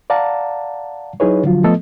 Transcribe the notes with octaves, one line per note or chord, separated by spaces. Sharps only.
D5 F5 F#5 A5 A#5
F#3 D#4 E4 G#4 B4 C#5
D3 F3 F#3 F4
F3 A3 B3 A4 D#5